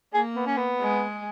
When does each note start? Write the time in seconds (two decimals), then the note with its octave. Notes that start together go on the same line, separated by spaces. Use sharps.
0.14 A#3 G#4
0.36 B3
0.46 C#4
0.57 B3
0.80 G#3